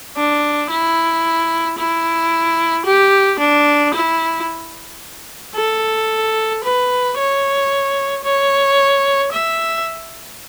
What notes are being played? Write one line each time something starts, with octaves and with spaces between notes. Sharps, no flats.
D4
E4
E4
G4
D4
E4
A4
B4
C#5
C#5
E5